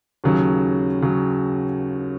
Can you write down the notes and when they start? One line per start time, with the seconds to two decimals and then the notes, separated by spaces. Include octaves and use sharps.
0.24 D#2 C#3 F#3
1.02 C#3 F#3